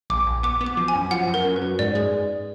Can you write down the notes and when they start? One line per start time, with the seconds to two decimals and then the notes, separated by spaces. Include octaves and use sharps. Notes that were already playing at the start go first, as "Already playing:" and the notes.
0.10 A#1 D6
0.26 A#1
0.43 B3 D6
0.61 B3
0.66 D6
0.77 F3
0.88 G#5
0.95 F#2
1.11 F3 F#5
1.28 F#2
1.34 A#4
1.45 F#2
1.56 B4
1.62 F#2
1.79 G#2 D5
1.95 G#3